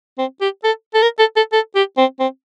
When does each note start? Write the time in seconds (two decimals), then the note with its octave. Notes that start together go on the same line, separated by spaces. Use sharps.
0.18 C4
0.41 G4
0.64 A4
0.94 A4
1.02 A#4
1.19 A4
1.36 A4
1.53 A4
1.75 G4
1.98 C4
2.20 C4